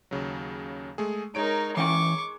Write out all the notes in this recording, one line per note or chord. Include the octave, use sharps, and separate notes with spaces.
D#2 C#3 F#3
G#3 A3 G#4
G#3 D#4 A#4 C#5 D7
E3 C#4 G5 C#6 D6